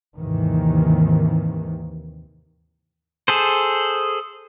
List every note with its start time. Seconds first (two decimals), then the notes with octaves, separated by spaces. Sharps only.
0.20 D#2 G#2 C3 D#3 E3
3.28 G#4 A4 C5